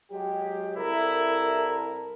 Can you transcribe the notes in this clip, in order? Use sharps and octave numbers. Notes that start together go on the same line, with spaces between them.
F#3 G#3 G4
C2 E4 A4 A#4